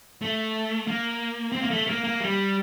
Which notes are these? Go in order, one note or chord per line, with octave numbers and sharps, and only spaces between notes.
A3
A#3
C4
A#3
A3
A#3
A#3
G3